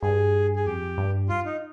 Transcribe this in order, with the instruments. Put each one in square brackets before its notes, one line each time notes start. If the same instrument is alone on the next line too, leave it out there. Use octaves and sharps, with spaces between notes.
[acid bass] G2 [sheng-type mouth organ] G#4
[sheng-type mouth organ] G#4
[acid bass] F2 [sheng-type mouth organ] G4
[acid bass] G2
[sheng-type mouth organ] F4
D#4